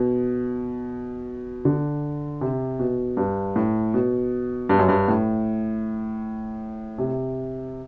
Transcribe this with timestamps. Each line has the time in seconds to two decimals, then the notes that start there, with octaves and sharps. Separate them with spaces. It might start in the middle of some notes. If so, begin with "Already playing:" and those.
Already playing: B2
1.65 D3
2.41 C3
2.79 B2
3.17 G2
3.56 A2
3.94 B2
4.69 G2
4.79 F#2
4.89 G2
5.08 A2
6.98 C3